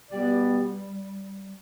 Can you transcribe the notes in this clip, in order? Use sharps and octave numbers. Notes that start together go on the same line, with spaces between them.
B2 G3 B3 G4 D5